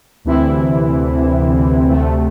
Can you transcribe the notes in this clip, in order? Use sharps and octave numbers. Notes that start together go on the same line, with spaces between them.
D2 C3 E3 C4 E4
D2 C3 A3